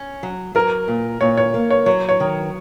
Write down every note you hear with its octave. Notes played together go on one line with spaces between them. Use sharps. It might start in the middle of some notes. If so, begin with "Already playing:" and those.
Already playing: C#4
F#3
F#3 A#4
A#2
A#2 C#5
C#5
A#3
C#5
F#3 C#5
C#5
D#3